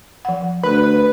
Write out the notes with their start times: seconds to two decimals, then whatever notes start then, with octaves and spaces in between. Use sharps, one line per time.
0.25 F3 F#5
0.63 D2 B4